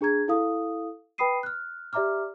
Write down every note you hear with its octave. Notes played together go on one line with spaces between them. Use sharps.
D4 G#4 A#5 G#6
E4 A4 F5 D#6
B4 G5 B5 D#6 C7 D#7
F6 F#6
G4 D5 E5 A#5 D6 F6